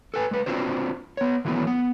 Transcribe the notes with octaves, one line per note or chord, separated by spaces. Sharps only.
A4 B4 G#5
G#3 B4
C4 D4 F4 F#4 C5
B3 C#5
D#3 E3 F#3 A3 B3
B3